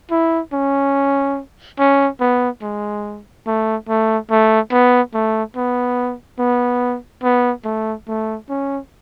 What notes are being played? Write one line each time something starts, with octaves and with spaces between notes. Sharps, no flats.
E4
C#4
C#4
B3
G#3
A3
A3
A3
B3
A3
B3
B3
B3
A3
A3
C#4